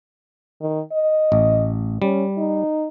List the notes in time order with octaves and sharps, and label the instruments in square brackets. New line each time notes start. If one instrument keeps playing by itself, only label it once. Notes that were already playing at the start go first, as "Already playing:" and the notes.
[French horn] D#3
D#5
[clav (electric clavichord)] A1
[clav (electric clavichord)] G3 [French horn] C#4
[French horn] D#4